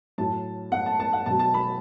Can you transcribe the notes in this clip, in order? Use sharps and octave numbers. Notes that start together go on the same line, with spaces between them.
A2 F#3 A5
F#5
A5
A5
F#5
B2 F#3 A5
A5
B5